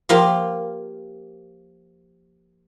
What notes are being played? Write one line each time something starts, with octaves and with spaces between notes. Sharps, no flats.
F3 A#3 F4 G4 A#4